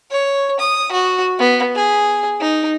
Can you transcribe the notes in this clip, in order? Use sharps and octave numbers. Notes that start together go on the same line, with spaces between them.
C#5
D#6
F#4
B3
G#4
D#4